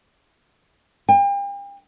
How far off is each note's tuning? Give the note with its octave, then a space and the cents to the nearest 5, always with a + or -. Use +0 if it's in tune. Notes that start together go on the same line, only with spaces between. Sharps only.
G5 +40